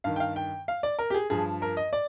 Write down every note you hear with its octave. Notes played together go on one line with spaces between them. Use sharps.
G2 D#3 F5
G5
F5
G5
F5
D5
A#4
G4
G#4
G2 F3 G#4
A#4
D#5
D5